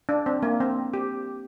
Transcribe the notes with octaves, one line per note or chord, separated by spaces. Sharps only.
D4
C4
A#3
C4
G4